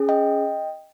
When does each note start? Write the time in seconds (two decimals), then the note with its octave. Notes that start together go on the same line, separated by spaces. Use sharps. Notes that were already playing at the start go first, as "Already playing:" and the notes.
Already playing: C#4 G#4
0.09 D#5 G5